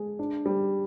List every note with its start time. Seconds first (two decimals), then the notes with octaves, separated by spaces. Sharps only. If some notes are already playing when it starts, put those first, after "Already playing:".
Already playing: G#3
0.19 D4
0.46 G3